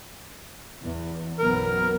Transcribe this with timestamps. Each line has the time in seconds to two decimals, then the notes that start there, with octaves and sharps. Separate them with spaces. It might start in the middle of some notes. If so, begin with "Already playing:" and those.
0.82 E2
1.39 B1 F#2 B3 A#4